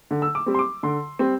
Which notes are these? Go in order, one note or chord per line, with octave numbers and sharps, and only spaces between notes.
D3
E6
D6
G3 C4
C6
D6
D3 C6
G3 C4